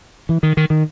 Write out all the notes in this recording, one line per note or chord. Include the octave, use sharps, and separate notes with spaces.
E3
D#3
D#3
D#3